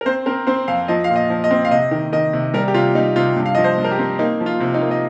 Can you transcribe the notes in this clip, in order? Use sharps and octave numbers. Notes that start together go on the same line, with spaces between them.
A#4
C4 C5
C4 A#4
C4 C5
F2 F5
F3 D#5
F5
A#2
D#5
F3
D#5
C4
F5
C3 D#5
D#3
D#3 D#5
C3
G3 A#4
G4
C3 F4
G3 D#4
C3 F4
G2
F5
F3 D#5
C5
G2
A#4
G4
C4
A#3 D#4
F3
F4
C3
D#4
A#3
D#5